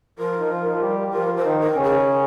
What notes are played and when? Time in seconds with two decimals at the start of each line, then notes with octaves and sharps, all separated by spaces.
0.19 F3 F4 A#4
0.39 D#4
0.51 F3 F4
0.66 D#4
0.74 F4
0.81 G3 G4
1.08 G4
1.13 F3 F4 A#4
1.37 C5
1.45 D#3 D#4
1.60 A#4
1.76 C#3 C#4
1.83 G#4